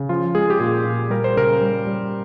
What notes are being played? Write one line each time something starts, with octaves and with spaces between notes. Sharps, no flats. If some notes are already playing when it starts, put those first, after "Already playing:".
Already playing: C#3
F3 F4
G#3 G#4
G4
A#2 G#4
A#2
G3 A#4
C5
C#3 A#4
G3
G3